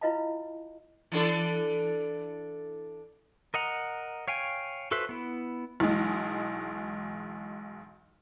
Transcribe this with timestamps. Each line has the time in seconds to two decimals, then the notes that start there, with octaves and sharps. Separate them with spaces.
0.01 E4 F4 B4 D#5 F5 A5
1.12 E3 D4 A4
3.54 A#4 D#5 F#5 A#5
4.28 C#5 F5 G5 G#5
4.91 F#4 A4 B4 C5 E5
5.09 B3 E4
5.80 B1 E3 G#3